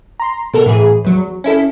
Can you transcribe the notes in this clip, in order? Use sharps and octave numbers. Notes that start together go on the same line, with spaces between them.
A#5 C6
B2 A4 A#4
A2 E3 G#4
E2 F#3
C#4 E4 A4